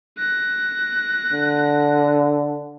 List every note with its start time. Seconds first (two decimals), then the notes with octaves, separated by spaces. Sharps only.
0.18 F#6 A#6
1.33 D3